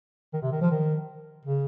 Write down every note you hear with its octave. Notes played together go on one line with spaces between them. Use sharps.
D#3
C3
D#3
F3
D#3
C#3